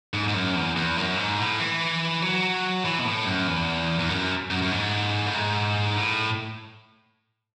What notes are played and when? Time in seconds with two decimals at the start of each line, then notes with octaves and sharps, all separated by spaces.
0.14 G#2
0.28 G#2
0.34 F#2
0.56 E2
0.76 E2
0.97 F#2
1.18 G#2
1.39 A2
1.60 E3
2.22 F#3
2.85 E3
2.99 B2
3.05 A2
3.26 F#2
3.47 E2
3.99 E2
4.09 F#2
4.50 F#2
4.62 F#2
4.72 G#2
5.26 A2
5.34 G#2
5.96 A2